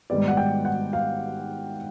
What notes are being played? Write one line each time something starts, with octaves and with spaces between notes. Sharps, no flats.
G#2 D#3 G3 B3 D5
F#5
G5
F#5
F5